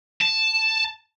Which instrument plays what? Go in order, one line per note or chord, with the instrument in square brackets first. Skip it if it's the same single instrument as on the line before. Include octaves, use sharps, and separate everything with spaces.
[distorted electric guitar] A5